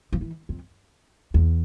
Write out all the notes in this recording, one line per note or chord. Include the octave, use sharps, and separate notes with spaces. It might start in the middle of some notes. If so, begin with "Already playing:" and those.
F3
E3
F2
E2